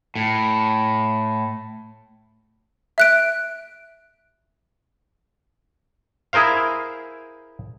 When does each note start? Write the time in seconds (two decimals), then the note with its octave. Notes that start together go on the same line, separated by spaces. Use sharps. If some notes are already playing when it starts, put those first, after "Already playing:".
0.15 A2
2.98 E5 F#6 D7
6.33 E4 G#4 A#4 C5 F5